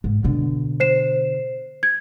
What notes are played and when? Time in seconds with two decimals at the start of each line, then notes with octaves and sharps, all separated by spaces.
0.04 G#2
0.24 B2 D3
0.80 C5 C7 E7
1.83 G#6